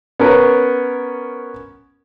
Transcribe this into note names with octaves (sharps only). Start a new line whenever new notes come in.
B3 C#4 A#4